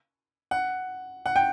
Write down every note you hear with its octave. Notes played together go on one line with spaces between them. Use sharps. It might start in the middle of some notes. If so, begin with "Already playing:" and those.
F#5
F#5
G5